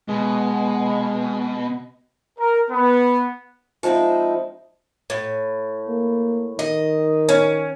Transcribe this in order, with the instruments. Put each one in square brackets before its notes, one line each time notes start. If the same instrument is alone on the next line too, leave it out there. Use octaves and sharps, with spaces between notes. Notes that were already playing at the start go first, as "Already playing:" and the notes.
[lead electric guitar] B2 [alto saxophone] G#3
[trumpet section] A#4
B3
[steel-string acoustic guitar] F3 G#3 C4 D#4 E4
[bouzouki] A2
[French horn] A#3
[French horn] D#3 [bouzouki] D#5
[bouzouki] C#4